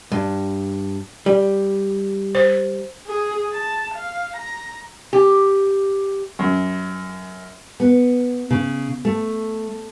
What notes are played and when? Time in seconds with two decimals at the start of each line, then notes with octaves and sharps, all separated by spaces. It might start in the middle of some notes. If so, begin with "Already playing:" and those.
0.12 G2
1.26 G3
2.35 C5
3.07 G#4
3.53 A5
3.95 F5
4.37 A#5
5.13 G4
6.39 F#2
7.80 B3
8.51 C#3
9.05 A3